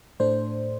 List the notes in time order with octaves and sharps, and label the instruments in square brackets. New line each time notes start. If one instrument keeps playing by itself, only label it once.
[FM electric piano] A2 A3 D4 C5